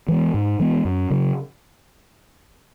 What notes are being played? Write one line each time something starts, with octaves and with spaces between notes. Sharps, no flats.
E3 G#3 B3
G#2
E3 G#3 B3
F#2
C#3 F#3